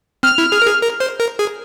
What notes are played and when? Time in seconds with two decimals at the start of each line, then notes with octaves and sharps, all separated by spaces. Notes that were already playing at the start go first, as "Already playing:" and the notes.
0.23 C4 F6
0.38 E4
0.52 G#4
0.62 A#4
0.66 G#4
0.81 A#4
1.00 C5
1.20 A#4
1.39 G#4